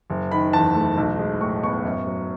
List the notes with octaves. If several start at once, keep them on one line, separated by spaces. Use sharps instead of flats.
F#1
D#3 B5
E2 A5
A3
B1
G#3
A2 C#6
B3 C#6
F#2
F#3